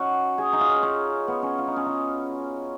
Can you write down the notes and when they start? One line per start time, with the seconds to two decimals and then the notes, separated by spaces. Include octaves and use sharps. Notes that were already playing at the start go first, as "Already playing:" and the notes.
Already playing: C#4 D#4 F#4
0.38 G#4
0.53 D#4
0.61 F4
0.82 C#4
1.28 B3
1.42 C#4
1.58 F4
1.67 D#4
1.76 C#4
1.86 D#4